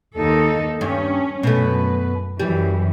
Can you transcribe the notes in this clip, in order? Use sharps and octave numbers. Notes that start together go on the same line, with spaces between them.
D#2 D#4 A4
G2 C#4
F#2 B2 A3 B4
F#2 E3 G3